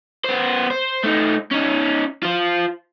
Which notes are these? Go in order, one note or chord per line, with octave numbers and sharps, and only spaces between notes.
B3 C5
C5
A3 D#4
C#4 D#4
F4 C5